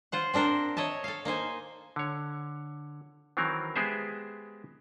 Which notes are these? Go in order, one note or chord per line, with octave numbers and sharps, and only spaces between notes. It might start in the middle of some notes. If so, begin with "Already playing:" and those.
F4 C5 F#5
C4 D4 A#4 C5
C#5 D#5 E5 A5
A4 F5
A#3 D#4 C5 G#5
D3 C#5
D#3 E3 F#3 C4 A#4
G#3 B3 G4 G#4 C5 E5